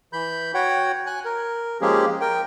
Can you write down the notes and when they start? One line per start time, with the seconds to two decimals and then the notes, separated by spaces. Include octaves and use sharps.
0.13 E3 B5 G6
0.54 F#4 C#5 F#5 G5
1.07 G#5 F#6
1.25 A#4
1.81 F3 G#3 A#3 C#4 G4 G#4
2.21 A#4 G5